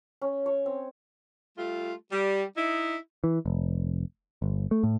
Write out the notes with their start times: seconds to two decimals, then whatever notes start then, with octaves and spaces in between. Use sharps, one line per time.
0.22 C#4
0.46 C#5
0.66 C4
1.58 G3 A3 F4
2.12 G3
2.57 D#4 E4
3.24 E3
3.46 F1
4.42 G1
4.71 A3
4.84 A2